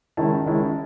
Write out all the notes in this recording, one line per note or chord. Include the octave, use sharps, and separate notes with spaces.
D#3 G#3 C#4 E4 A5
D#3 G#3 C#4 E4